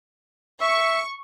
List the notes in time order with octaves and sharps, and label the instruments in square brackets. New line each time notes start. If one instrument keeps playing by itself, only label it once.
[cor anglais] E5 [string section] C#6